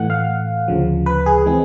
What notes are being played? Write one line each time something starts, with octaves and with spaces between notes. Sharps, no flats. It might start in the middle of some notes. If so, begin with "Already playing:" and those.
Already playing: A2 E3 A3 F#5
F5
D2 C#3 F3
B4
G#4
E3 G#3 C4